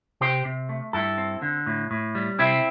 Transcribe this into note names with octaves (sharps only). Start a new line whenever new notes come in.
C3 G4 C5
C3
A3
G2 E4 A4
C4
D3
A2
A2
G3
C3 C4 E4